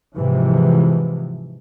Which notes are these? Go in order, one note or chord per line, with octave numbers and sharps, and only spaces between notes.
G#2 C3 E3 F3